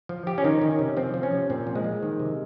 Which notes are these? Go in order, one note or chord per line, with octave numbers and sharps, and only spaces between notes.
F3
F3 G4
C#4
D#3 D#4
D#3
C#4
C3
F3 C4
F3
C#4
C3
A#2 C4
F3
G#3
F3
D#3
C3